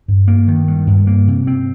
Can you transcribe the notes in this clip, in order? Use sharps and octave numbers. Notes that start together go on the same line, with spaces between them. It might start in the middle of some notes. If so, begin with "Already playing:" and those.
G2
A#3
D#3
G2
G2
A#3
C3
C4